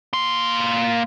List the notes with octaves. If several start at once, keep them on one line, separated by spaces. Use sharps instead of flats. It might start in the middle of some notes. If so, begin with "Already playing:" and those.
A#3 C6